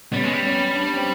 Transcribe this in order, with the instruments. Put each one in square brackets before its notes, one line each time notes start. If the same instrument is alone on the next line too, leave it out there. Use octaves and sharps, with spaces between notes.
[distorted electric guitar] G3 [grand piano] B3 C#4
[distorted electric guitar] G#3
G3
[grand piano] B3 C#4
D4
C#4
C4